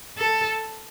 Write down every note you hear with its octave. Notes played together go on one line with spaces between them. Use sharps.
A4